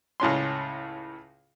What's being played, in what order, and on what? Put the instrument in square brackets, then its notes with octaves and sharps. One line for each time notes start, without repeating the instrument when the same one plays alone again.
[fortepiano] C#2 A2 C#4 C6